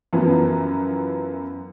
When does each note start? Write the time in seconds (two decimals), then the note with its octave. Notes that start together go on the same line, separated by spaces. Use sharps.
0.13 F#2 E3 F3 B3